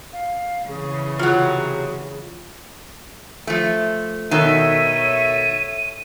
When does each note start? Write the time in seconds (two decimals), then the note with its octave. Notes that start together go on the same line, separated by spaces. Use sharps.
0.13 F5
0.68 C#3 E3 G#4
1.19 C3 F#3 F4
3.47 F3 A3
4.31 B2 D#3 A4 C#5 E5 D#7